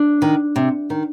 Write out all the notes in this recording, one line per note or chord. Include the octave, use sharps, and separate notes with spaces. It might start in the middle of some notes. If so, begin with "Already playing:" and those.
Already playing: D4
D#3
C3
D#3